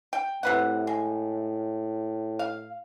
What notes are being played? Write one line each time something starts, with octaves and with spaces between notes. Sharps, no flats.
G5
A2 C3 B4 F#5
G#3
F5